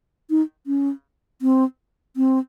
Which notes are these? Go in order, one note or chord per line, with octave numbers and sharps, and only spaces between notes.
D#4
C#4
C4
C4